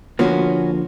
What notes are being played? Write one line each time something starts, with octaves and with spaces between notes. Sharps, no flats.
D3 F3 A#3 B3 C#4 F#4